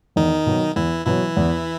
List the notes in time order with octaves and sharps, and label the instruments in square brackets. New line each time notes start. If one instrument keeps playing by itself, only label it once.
[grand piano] E2 [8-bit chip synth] D#3 D#4
[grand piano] B2 F#3
[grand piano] E2 [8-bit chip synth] E3 E4
[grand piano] B2 F#3 [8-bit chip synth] E3 E4
[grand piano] E2